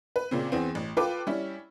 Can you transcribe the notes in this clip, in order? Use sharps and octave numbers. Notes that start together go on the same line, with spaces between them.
B4
A#2 C#3 C4
E2 B3 C4
A1
F4 A4 B4 G5 D6
G3 C#4 E4